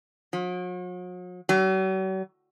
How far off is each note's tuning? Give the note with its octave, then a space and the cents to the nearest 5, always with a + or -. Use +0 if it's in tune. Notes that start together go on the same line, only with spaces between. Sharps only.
F#3 -45
F#3 +45